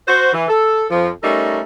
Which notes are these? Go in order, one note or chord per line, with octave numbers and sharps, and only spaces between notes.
F#4 C5
E3
A4
F2 F3
G3 A3 C#4 D#4 A4 A#4